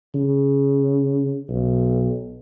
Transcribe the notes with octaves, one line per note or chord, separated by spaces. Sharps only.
C#3
B1